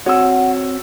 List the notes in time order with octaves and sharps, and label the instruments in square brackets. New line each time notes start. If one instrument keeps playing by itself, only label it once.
[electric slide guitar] C4 C#5 [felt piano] F#4 E6 [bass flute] F#5